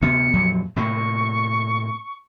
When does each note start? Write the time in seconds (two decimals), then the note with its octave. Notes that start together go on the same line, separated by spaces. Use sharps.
0.02 D2 C3 B3 C#7
0.33 F2 A#2 F#3
0.76 A2 C3 A#3 C#6